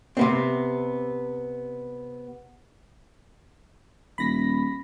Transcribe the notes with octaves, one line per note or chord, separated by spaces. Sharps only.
C3 B3 C4
D#1 B5 A#6 B6